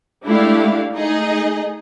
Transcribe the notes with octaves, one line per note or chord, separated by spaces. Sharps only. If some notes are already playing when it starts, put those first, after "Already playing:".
G#3 A3 D4 E4 G4 F5
A3 D#4 G#4 D#5